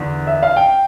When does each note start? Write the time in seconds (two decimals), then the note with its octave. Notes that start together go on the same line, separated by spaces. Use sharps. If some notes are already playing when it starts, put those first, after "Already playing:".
Already playing: E2 D3
0.27 E5
0.43 F5
0.56 G5